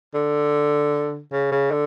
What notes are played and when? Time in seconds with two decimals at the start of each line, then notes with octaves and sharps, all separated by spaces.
0.15 D3
1.32 C#3
1.52 C#3
1.71 D3